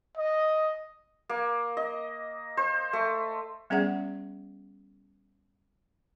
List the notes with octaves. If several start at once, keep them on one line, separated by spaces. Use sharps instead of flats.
D#5
A#3
D#5
C5
A3
G3 B3 C#4 G#4 D5 F#5